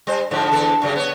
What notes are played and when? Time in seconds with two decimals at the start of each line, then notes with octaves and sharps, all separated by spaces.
0.07 G3 C5
0.31 G#2 D3 F3
0.52 E2 D3 A4
0.82 F#2 C#3 G3
0.96 B3 C#5